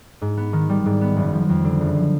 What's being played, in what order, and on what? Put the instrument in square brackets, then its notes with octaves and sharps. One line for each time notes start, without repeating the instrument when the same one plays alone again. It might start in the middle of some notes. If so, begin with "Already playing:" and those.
[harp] G#2
B3
D#3
G3
G#2
B3
F#1
F3
F2
D3
F#1
F3